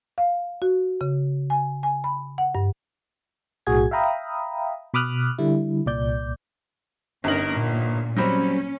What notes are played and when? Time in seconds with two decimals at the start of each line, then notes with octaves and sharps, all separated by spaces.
0.18 F5
0.62 F#4
1.01 C#3
1.50 G#5
1.83 G#5
2.04 B5
2.38 F#5
2.55 G2
3.67 B1 A2 F#4 G#4 G#6
3.91 E5 F5 G5 A#5 B5 D#6
4.94 B2 B5 D6 D#6 F6 F#6
5.38 D3 G3 E4
5.86 C2 A#2 D5 G6
7.24 G1 C#4 D#4 A#4 F#7
7.54 A#2
8.17 F#3 G3 C4 C#4